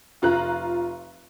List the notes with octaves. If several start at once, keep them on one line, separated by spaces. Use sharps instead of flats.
F1 F4 A#5 F#6